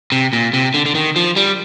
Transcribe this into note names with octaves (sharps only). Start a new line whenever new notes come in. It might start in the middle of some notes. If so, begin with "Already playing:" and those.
C3
A#2
C3
D3
D3
D#3
F3
G3